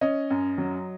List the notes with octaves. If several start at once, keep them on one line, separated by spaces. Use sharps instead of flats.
C#4 D#5
F#2
F#3